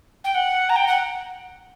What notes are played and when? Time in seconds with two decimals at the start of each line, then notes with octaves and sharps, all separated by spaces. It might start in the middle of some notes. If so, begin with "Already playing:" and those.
0.24 G5
0.34 F#5
0.69 A#5
0.76 G5
0.88 F#5